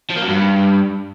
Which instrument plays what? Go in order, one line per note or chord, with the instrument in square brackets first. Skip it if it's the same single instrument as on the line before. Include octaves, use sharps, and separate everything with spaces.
[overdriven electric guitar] F3
A#3
F#3
G2